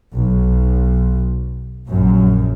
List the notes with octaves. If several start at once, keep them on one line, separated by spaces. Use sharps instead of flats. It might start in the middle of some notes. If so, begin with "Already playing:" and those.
B1
A#1 F#2